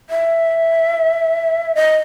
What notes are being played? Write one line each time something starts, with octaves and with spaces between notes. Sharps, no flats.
E5
D#5